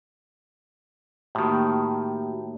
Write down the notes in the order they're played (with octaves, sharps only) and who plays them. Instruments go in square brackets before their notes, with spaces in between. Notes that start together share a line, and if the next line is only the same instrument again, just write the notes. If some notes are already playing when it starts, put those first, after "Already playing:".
[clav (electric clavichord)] A2 D#3 [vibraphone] A#3 F#4 G4